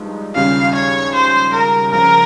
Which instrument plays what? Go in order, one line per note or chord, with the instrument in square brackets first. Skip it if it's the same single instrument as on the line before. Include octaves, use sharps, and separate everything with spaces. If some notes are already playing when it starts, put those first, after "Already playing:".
Already playing: [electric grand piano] G2 F3 G#3 D#4
[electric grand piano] D#2 C#3 G3 C#4 F4 [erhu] F5
[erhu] C#5
C5
A#4
[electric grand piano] C#2 C#3 F3 [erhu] A#4